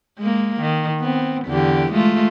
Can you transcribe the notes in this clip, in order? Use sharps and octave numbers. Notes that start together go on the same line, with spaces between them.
G#3 A#3
D#3
B3 C4
E2 D3 G4
G#3 A3 F4